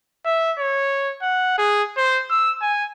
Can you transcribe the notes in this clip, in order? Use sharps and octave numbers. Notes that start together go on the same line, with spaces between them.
E5
C#5
F#5
G#4
C5
E6
G#5